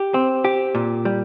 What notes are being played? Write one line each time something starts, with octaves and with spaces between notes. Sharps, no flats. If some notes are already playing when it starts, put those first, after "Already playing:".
Already playing: G4
C4
G4
A#2
G3